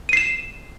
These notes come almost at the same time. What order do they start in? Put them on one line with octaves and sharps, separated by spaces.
D#7 C7 E7